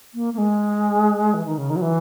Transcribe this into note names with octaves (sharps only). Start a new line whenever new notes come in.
A#3
A#3
G#3
E3
D#3
C#3
D#3
F#3
E3